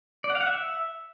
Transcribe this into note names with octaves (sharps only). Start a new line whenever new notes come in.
D5
F#5
F5
F#5
E5